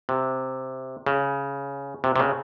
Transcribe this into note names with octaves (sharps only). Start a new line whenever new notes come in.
C3
C#3
C3
C3
C#3